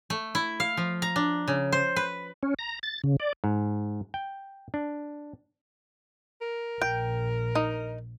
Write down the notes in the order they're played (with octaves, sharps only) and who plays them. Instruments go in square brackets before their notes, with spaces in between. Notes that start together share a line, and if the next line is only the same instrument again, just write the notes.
[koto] A3
E4
F5
F3
A#5
D4
C#3
C5
B4
[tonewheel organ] C#4
A#5
A6
C#3
D5
[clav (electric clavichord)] G#2
G5
D4
[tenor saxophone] A#4
[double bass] A#1 [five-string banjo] G5
[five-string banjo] D#4